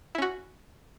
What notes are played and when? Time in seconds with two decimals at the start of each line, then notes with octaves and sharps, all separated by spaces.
0.15 E4
0.18 C#4
0.22 F#4